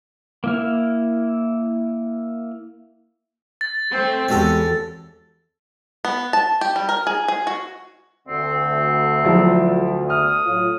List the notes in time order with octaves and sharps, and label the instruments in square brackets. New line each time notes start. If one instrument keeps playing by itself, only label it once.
[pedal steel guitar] A#3 E4 F6
[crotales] A6
[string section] A3 C4
[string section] E2 [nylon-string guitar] G#3 F#4 G4 [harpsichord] A4 C#5
[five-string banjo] B3
A5
G4
G3
A#4
G#4
G#4
F#4
[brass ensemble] D2 [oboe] C4
[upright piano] F3 F#3 E4
[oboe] D#6 [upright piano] F6
[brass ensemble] A2 F#3 F4